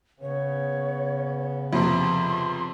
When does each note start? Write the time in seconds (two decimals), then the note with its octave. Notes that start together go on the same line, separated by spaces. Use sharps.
0.22 C#3 B3 C#5
1.73 F2 C3 C6